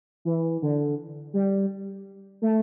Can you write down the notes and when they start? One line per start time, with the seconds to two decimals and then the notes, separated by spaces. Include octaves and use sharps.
0.25 E3
0.62 D3
1.33 G3
2.42 A3